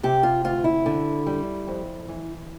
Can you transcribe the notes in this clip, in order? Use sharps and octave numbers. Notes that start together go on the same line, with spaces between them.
C3 G4
F4
D2 F4
E4
D3
G3
F2
E3